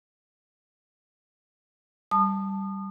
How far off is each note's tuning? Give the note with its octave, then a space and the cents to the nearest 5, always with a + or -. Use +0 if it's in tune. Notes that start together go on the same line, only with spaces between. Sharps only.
G3 -10 A5 +0 D#6 -35